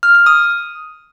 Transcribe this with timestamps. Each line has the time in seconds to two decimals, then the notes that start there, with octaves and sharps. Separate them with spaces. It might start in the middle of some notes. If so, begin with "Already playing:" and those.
0.03 F6
0.15 F6
0.26 D#6